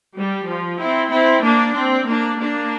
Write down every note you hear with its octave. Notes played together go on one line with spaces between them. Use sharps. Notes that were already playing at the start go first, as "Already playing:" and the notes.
G3
F3
C4 E4
C4 E4
A#3 D4
C4
A#3 D4
A#3 D4